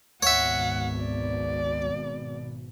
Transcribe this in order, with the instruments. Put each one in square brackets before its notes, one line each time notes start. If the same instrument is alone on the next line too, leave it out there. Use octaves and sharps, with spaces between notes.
[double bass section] G#1 B2 [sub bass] D2 [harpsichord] C#5 E5 [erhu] F#5
[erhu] D5